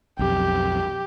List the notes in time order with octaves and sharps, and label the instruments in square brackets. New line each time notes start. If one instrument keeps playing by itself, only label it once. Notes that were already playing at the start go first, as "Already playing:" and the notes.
[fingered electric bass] B1 F2 [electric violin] G4